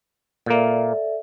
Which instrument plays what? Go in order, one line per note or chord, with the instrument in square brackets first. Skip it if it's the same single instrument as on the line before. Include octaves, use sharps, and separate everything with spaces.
[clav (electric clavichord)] A#2 A#3 [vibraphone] A4 D5 E5